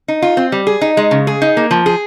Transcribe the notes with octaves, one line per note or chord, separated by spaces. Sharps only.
D#4
F4
C4
G3
G#4
D#4
G#3
C#3
G#4
D#4
A#3
F3
G#4